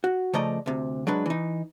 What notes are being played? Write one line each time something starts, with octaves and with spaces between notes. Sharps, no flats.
F#4
C#3 F3 A3 D5 D#5 A#5
D2 C3
F#3 G#3 D4 B4
E3 D#4